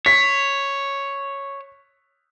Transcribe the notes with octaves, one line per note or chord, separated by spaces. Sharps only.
C#5 B6